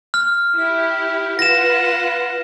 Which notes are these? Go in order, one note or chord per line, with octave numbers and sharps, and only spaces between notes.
F6
E4 G4
F4 B4 F#5 A#6 E7